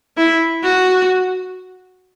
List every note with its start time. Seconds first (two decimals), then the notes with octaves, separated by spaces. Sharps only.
0.17 E4
0.63 F#4